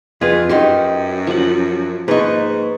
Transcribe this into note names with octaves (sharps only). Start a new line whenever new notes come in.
F2 F4 G#4 B4 F5
F#2 D#4 F#4 G4 C6
F3 F#5
G#2 A#3 D#4 B4 C#6